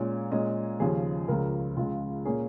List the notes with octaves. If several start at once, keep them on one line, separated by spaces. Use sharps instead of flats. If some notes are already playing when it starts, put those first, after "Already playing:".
Already playing: A#2 G#3 C#4
A#2 G#3 C#4 D#5
D#2 C#3 F3 C#4 G#4
C#2 C#3 F3 A#4
C#2 C#3 G#3 F4
A#2 A#3 C#4 G#4